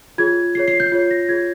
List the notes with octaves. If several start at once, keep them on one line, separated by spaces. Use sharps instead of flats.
F4 G#4 C#5 G#6
F4 G#4 C#5 C7
C7
G6
F4 G#4 C#5 C7
A#6
F4 G#4 C#5 G#6